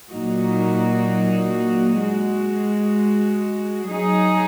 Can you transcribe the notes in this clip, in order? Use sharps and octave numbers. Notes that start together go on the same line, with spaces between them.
A#2 F#3 A#3 D#4 F#4
G#3 F#4
F#3 D#4 G#4